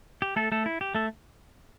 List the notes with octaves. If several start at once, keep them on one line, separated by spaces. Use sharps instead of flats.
G4
A3 A4
A3 A4
E4
G4
A3 A4